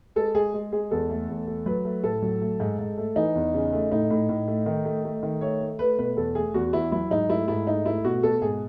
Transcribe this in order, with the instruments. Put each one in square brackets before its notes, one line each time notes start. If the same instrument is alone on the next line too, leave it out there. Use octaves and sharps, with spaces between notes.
[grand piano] G#3 A4
G#3 G#4
G#3
G#3 G#4
E2 A4
A3
E2
A3
F#3 B4
A3
A2 A4
F#3
A3
G#2
G#2
A3
E3 D#4
E2
C#3
A3
A2 D#4
A2
A2
A3
D#3
A3
A3
D#3
A3 C#5
A3
A3 B4
B2 B4
E2 A4
A3 G#4
E2 F#4
E2 E4
F#3 E4
G#2 D#4
A3 E4
G#2 E4
A3 D#4
A3 E4
B2 F#4
B2 A4
G#2 G#4